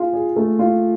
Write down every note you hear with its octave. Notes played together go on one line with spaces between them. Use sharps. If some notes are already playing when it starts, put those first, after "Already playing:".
Already playing: F4 G#4
G#4
A3
F4